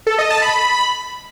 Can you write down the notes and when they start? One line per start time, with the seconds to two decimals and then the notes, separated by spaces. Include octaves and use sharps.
0.07 A4
0.18 D#5
0.30 A5
0.42 B5